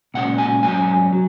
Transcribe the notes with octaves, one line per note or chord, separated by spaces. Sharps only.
A#2 G#3 C#4 F#5
G#5
G#2 F#3 C#4 G#5
F#3